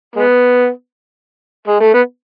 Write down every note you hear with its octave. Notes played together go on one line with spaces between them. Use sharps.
G#3 B3
G#3
A3
B3